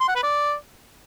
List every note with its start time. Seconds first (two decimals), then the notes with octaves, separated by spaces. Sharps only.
0.01 C6
0.08 F#5
0.16 B4
0.23 D5